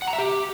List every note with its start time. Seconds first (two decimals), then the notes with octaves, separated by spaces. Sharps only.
0.02 F#5
0.08 A#5
0.13 E5
0.19 G4